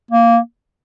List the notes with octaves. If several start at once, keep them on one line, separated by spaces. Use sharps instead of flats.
A#3